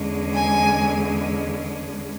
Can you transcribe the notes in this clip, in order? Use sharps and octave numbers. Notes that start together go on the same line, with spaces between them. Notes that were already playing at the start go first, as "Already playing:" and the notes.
Already playing: E2 D3 G#3 C#4
G#5